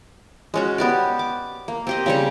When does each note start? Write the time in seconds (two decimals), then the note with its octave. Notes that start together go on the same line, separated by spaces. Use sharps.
0.54 G#3 C#4 F#4
0.78 B3 G4 D5
1.19 D6
1.68 A#3
1.87 C4 G4 D#5
2.06 C#3 G3 C#5